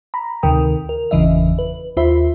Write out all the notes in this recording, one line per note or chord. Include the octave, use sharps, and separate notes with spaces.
A#5 B5
D2 C3 D#3 A#4 G5 D#6
A#4
G1 E2 C#3 E3 D#5 E5
B4
D#2 F4 C5 E5 B5